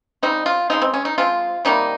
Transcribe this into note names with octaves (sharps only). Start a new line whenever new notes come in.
C#3 G3 C4 D#4
F4
C#3 G#3 C4 D#4
C4
C#4
D#4
F3 G#3 C4 F4
C3 D#3 G3 A#3 D#4